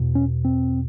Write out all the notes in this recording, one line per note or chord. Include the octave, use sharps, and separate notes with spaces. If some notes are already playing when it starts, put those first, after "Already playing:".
Already playing: E2 B2
C#4
C4